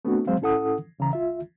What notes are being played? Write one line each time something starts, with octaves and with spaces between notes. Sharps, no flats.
A3 B3 C4 D4 F#4
F#3 G#3 C4 C5 F5
A2 C#4 E4 A4 F#5 D#6
D#2 C#3 E3 A#5
C2 F4 E5